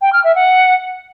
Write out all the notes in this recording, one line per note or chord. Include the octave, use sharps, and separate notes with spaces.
G5
F6
E5
F#5